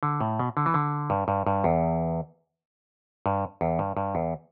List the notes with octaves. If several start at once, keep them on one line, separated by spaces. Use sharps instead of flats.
D3
A2
B2
D3
E3
D3
G2
G2
G2
E2
G2
E2
G2
G2
E2